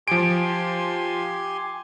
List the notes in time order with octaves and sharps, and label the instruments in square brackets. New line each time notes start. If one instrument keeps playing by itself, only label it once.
[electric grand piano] F3 D7 [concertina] G4 G#5 C6